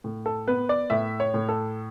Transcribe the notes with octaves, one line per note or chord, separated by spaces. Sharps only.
A2
A4
B3 B4
D5
A2 E5
C#5
A2
A4